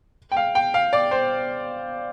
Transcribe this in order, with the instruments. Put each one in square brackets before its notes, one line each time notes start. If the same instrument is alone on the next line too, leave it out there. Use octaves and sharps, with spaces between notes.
[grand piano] G5
F5
G5
F5
D5
C5